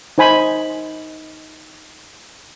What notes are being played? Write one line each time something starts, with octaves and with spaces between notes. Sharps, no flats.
D#4 C5 G#5 B5